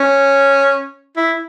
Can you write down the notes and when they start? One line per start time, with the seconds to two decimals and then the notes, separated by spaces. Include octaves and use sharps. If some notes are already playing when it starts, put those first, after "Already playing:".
Already playing: C#4
1.17 E4